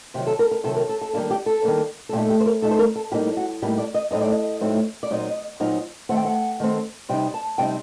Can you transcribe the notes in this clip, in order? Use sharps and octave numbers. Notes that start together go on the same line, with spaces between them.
C3 D#3 F#3 G4
A4
A#4
A#4
C3 D#3 F#3 A4
A#4
A4
A4
D#3 G3 A#3 D4 A4
G4
A4
D#3 G3 A#3 D4
A4
A#2 A3 D#4 G4
G4
C5
A#4
A#2 A3 D#4 A4
C5
A#4
A4
A2 G3 A#3 D#4 G4
F#4
A2 G3 A#3 D#4 G4
D5
D#5
A2 F#3 A3 C4 D#4 D#5
D5
D#5
A2 F#3 A3 C4 D#4
D5
A#2 F#3 C4 D#4 D#5
A#2 F#3 C4 D#4
D#3 A3 C4 F#5
G5
F#5
D#3 A3 C4
C3 G3 C4 D#4 G5
A5
C3 G3 C4 D#4 G5